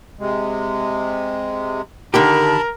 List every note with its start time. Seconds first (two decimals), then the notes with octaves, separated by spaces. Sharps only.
0.19 C3 G#3
2.14 D3 D#3 G4 A#4 A5 B5